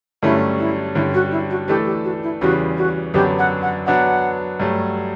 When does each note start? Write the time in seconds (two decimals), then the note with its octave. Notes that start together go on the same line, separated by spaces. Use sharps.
0.23 G2 D3 F#3 A3 C#4 E4
0.59 E4
0.95 G2 D3 G3 C#4 E4
1.14 F#4
1.31 E4
1.50 F#4
1.68 E3 A3 D4 G4 A4
1.86 G4
2.04 F#4
2.23 E4
2.41 E2 C#3 E3 G3 F#4
2.78 F#4
3.14 F#2 D3 F#3 B3 D4 G4
3.39 F#5
3.62 F#5
3.86 F#3 B3 D4 F#4 F#5
4.60 G2 F#3 A3